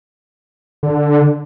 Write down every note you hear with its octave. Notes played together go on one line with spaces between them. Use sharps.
D3